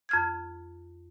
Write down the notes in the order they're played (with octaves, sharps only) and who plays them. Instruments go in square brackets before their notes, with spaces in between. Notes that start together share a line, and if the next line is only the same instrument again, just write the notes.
[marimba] F2 F6 G#6